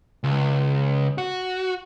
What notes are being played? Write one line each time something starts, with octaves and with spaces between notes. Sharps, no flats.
C#2
F#4